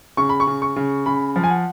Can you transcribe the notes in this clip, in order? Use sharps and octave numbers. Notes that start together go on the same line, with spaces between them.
C#3 C#6
B5
C#6
C#3
C#6
C#3
C#3 B5
F3
G#5
F#5